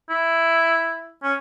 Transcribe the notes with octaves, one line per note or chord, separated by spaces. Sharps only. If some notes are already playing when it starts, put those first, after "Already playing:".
E4
C#4